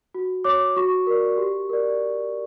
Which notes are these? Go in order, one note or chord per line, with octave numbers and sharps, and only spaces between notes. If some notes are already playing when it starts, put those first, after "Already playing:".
F#4
C#5 D6
F#4 C#6
A#4 D5
G4
A#4 D5